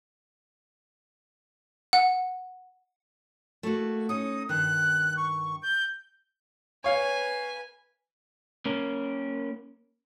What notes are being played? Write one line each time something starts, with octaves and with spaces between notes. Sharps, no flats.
F#5
A3 A#3 F#4
C#4 D#4 D#6
G2 D#3 F#6
C#6
G6
B4 C#5 F5 G#5
A#3 C#4 A#4